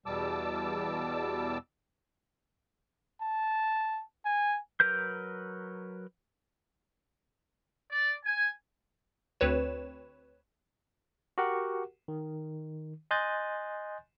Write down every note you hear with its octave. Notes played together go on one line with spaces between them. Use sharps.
E2 B2 G3 A5 D6 E6
A5
G#5
F#3 A#4 B4 G6
D5
G#5
D2 C4 B4 C#5 E7
F#4 G4 A#4 F#5
D#3
D#5 G#5 C6 F#6 G6 A6